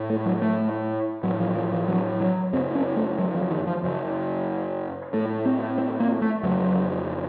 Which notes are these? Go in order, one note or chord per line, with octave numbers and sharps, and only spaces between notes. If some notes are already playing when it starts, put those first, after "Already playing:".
Already playing: A2
A3
F#3
A3
A2 F#3
F3
F3
F3
F#3
F#3
F#2 C#3 C4
C#4
A3
F#3
F3
D#3
F3
F#2 C#3
A2 A3
C4
C4
A#3
A3
F2 C#3 F#3